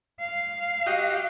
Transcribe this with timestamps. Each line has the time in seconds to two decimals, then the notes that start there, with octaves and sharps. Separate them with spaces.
0.20 F5
0.86 F#4 G4 D#5